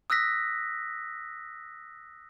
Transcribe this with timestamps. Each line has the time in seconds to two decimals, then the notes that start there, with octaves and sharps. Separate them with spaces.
0.10 D#6 E6 F#6 A#6 B6